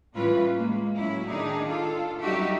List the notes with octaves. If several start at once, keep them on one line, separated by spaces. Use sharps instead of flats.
A2 E3 G3 C#4 F4 B4
G#3 A#3
A2 F#3 C#4 E4
D#3 D4 D#4 G#4
F4 A4
F#2 G3 D#4 F#4 G4 E5